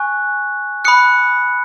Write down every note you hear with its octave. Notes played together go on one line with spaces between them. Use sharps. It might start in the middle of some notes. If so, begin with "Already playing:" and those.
Already playing: G#5 C#6 F#6
B5 D#6 F#6 C#7